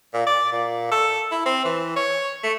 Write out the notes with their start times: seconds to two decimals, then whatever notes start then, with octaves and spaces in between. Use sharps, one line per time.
0.14 A#2
0.27 D5
0.52 A#2
0.91 A4
1.31 E4
1.46 C4
1.65 E3
1.96 C#5
2.43 A3